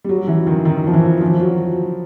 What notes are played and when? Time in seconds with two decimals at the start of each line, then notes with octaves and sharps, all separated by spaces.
0.04 G3
0.09 F#3
0.28 E3
0.47 D#3
0.65 D#3
0.87 F3
0.94 E3
1.21 F3
1.40 F#3